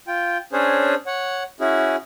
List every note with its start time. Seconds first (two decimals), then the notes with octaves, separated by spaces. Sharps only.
0.08 F4 G5
0.53 C#4 D4 G#4 C5 C#5
1.07 C#5 F#5
1.60 C#4 E4 F#4 G#4